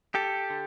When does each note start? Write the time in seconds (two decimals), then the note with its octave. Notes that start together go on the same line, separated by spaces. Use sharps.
0.15 G4 A4
0.50 D3